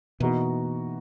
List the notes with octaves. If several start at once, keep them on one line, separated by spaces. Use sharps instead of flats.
B2 E3 A#3 D#4 F#4